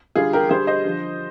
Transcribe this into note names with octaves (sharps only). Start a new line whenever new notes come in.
D3 G3 F4 G#4
G4 A#4
D3 G3 G#4 C5
C5 D#5
D3 F3